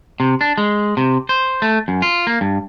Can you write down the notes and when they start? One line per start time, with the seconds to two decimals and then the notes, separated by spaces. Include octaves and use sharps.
0.20 C3
0.41 D4
0.58 G#3
0.97 C3
1.29 C5
1.62 A3
1.88 F#2
2.02 F4
2.27 A#3
2.41 G2